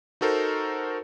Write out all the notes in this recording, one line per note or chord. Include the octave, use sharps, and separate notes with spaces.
D#4 F#4 A4 A#4 C5